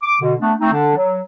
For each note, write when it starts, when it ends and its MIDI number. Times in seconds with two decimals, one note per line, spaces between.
0.02 0.15 86
0.20 0.34 47
0.20 0.34 50
0.39 0.53 57
0.39 0.53 59
0.39 0.53 62
0.60 0.71 57
0.60 0.71 60
0.60 0.71 63
0.72 0.92 50
0.72 0.92 62
0.96 1.23 54